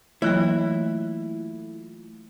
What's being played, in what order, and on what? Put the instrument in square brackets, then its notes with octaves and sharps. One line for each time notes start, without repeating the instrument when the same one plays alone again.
[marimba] E3 F#3 A#3 [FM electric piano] A3 F4 [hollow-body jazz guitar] E4